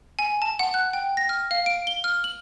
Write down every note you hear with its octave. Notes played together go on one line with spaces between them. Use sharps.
G#5
A5
F#5
F#6
G5
A#6
F6
F5
D7
G7
F6
F#7